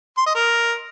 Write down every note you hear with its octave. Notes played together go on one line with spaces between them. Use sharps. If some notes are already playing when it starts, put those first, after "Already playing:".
C6
D#5
A#4